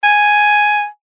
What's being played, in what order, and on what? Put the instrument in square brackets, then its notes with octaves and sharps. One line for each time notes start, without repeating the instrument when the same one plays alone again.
[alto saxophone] G#5